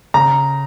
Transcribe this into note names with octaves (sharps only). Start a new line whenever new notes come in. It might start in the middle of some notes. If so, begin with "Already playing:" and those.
C#3 A#5